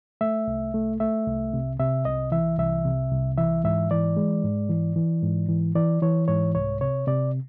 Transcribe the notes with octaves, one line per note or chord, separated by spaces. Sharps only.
A3 E5
C2
A3
A3 E5
C2
C3
C3 E5
C2 D#5
E3 E5
C2 E5
C3
C2
E3 E5
G#2 E5
E3 D5
G#3
G#2
E3
E3
G#2
E3
E3 D5
E3 C#5
G#2 C#5
C2 C#5
C3 C#5
C3 D5